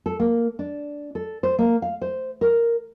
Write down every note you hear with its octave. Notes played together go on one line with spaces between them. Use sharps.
A4
A#3
D4
A4
C5
A#3
F5
C5
A#4